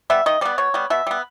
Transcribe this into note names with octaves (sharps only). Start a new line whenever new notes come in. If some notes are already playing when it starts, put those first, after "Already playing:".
G3 B3 E5
D#3 D#5
G3 B3 D5
B2 C#5
G3 B3
B2 E5
G3 B3